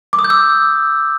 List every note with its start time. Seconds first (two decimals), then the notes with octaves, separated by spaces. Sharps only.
0.13 D6
0.19 D#6
0.24 G6
0.30 E6